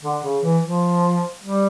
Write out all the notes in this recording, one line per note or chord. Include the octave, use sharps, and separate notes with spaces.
D3
C#3
E3
F3
G3